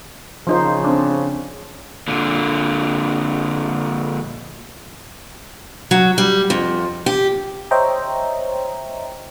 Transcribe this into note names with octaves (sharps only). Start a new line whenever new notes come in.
C#3 F3 D#4 C5
C4 D4
A#2 D3
F#3
G3
F2
G4
C5 C#5 D#5 E5 G5 A#5